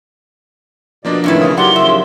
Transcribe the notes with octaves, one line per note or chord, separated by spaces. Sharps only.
B2 F3 A#3 D4 D5 D#5
A2 C3 D#3 E3 C#4 E4
C#3 F4 D#6
F3 F#3 E4 G4 A#4 D5 F#5 C6
D#2 C#3 F3 E5